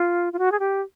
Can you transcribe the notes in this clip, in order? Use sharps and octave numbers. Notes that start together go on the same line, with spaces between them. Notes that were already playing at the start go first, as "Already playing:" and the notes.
Already playing: F4
F4
F#4
G#4
G4